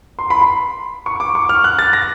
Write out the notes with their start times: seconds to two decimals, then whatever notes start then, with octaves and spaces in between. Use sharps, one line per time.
0.19 C6
0.30 B5
0.41 C6
1.06 C#6
1.20 D6
1.35 C#6
1.49 F6
1.64 F#6
1.79 A6
1.93 A#6